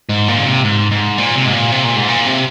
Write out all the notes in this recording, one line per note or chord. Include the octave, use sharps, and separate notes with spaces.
G#2
A#2
C#3
C3
G#2
G#2
A#2
C3
G#2
A#2
C3
A#2
G#2
A#2
C3